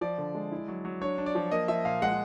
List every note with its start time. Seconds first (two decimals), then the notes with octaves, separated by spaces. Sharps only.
0.01 F3 D5
0.18 D3
0.35 G#3
0.52 E4
0.68 F#3
0.85 F#3
1.01 D4 C#5
1.18 D4
1.26 D5
1.35 F3
1.51 A#3 D#5
1.68 F3 E5
1.85 A#2 F5
2.02 G#3 F#5